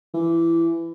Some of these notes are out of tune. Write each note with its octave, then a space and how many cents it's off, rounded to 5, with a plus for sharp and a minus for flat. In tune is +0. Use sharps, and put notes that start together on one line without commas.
E3 +20